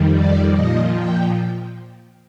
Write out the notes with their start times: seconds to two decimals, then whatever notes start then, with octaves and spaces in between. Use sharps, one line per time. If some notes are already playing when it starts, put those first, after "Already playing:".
Already playing: F2 D#3 G3
0.12 D5
0.51 A#2 F3 D#5
0.92 G5